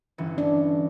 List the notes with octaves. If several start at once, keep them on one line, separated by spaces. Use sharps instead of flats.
G1 E3 C#4
D4